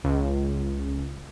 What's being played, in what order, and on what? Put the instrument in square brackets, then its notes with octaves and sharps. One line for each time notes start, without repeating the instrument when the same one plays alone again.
[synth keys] C#2